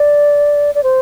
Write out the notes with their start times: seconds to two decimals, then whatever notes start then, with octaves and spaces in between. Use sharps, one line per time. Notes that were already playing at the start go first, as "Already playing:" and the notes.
Already playing: D5
0.75 D5
0.83 C5